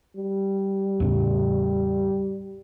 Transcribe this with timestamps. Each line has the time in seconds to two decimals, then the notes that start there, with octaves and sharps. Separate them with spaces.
0.17 G3
1.00 E2 A2 C#3